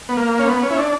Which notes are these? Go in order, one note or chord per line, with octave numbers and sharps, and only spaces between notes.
B3
A#3
C#4
B3
C#4
E4
D4